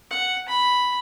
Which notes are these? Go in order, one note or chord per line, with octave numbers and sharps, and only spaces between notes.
F#5
B5